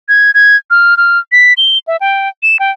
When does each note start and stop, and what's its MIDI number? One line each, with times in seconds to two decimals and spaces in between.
0.09 0.31 92
0.34 0.56 92
0.71 0.97 89
0.97 1.19 89
1.32 1.53 95
1.57 1.78 103
1.88 1.97 76
2.01 2.29 79
2.43 2.57 100
2.60 2.71 79